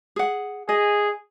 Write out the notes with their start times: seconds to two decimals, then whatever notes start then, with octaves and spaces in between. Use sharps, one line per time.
0.16 G#4 F#5
0.69 G#4 D#5